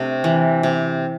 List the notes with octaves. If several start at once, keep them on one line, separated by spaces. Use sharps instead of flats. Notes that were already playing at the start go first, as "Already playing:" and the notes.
Already playing: C3 A3 D4
E3
C3